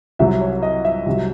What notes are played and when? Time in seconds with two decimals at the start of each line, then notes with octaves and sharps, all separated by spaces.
0.19 C2 C3 F#3 E5
0.41 C#5
0.63 D#5
0.85 E5
1.06 C2 C3 F#3